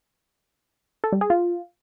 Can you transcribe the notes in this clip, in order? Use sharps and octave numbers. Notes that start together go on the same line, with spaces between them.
A4
G3
G#4
F4